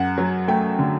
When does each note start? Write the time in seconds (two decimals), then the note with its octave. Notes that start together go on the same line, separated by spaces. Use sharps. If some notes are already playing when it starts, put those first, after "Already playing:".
Already playing: F#2 F#5
0.18 F#3
0.48 A3 G5
0.79 D3